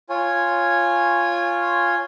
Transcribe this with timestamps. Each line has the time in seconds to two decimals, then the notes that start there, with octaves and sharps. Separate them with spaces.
0.09 F4 C#5 G#5